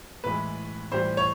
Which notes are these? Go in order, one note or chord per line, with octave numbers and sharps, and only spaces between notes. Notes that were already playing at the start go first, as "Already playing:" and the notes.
A2 E3 G#3 B4
A2 E3 G3 C5
C#5